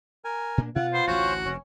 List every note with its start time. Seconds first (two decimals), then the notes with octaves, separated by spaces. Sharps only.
0.25 A#4 G#5
0.58 A#2 A#3 D4
0.76 B2 F4 F#5
0.93 B3 C5
1.07 A1 D2 C#4 F#4 C5 C#5
1.45 F1 C#3 C#4